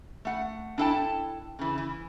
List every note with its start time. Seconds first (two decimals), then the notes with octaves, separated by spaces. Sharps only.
0.25 A3 F#5
0.78 D4 E4 A4 E5 G5 A5
1.59 C#3 E3
1.78 E3